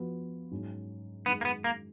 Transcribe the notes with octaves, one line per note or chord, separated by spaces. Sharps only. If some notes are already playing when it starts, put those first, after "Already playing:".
Already playing: F3 B3 F#4
G#2 F#3 C#4
F#2 D#3 G#3 B3
A#3
B3
A#3